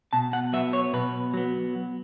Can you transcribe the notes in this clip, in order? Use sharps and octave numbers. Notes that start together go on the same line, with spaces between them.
B2 A5
F#5
F#3 B3 E5
C#5
B2 B4
F#3 B3